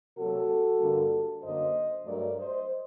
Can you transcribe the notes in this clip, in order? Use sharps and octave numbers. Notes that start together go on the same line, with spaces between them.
C3 F#3 A#3 F#4 A4
G2 D3 G3 A#3
F#2 D3 F#3 A#3 C5 D#5
G2 F#3 A3 A#4 D5
C5 D#5